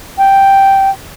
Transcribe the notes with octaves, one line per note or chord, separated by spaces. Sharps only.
G5